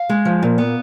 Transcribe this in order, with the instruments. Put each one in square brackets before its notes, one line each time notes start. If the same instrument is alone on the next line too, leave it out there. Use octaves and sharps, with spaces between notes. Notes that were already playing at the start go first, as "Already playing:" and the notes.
Already playing: [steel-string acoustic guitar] F5
G#3
F3
A#2
B3